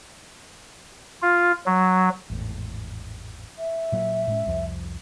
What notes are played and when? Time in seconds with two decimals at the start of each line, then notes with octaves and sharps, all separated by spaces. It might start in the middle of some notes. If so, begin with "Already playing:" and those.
1.22 F4
1.66 F#3
2.30 G#1 E2 A2
3.58 E5
3.92 A#2 F#3 A#3
4.27 A2 G#3 C#4
4.46 C2 F2 F3